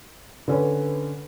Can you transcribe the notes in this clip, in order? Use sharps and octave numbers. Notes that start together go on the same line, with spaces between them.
D3 C#4 B4